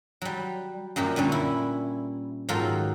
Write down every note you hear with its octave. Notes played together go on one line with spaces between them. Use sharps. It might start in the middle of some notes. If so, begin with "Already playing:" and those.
F#3 G3
F#2 A#2 F#3 G4
A#2 D3 G3 C#4
E4
G#2 D#3 F#3 F4 A4